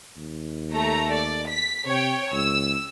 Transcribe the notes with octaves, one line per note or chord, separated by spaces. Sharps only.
D#2
A3 A#5
D5
B6
C3 C#5 G5
C#2 E6